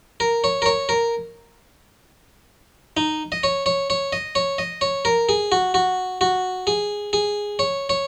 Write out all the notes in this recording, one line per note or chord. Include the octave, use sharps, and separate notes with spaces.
A#4
C#5
A#4
C#5
A#4
D#4
D#5
C#5
C#5
C#5
D#5
C#5
D#5
C#5
A#4
G#4
F#4
F#4
F#4
G#4
G#4
C#5
C#5